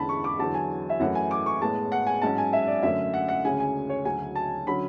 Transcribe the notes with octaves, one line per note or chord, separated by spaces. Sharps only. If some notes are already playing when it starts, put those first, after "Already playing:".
Already playing: E2 D3 G#3 C#4 A5 B5
C#6
D6
E2 D3 F#3 A5
G#5
E5
F#2 E3 A3 C#4 F#5
G#5
D6
C#6
A2 G#3 B3 A5
F#5
G#5
G#2 F#3 C#4 A5
G#5
E5
D5
F#2 D3 A3 C#4 E5
F#5
F#5
D2 C#3 G#3 C#4 G#5
G#5
C#5
D2 C#3 F#3 G#5
A5
D3 F#3 C#4 B5